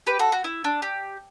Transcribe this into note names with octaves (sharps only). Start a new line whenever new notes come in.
G4 B4
F#4 A4
F#4
E4
D4
G4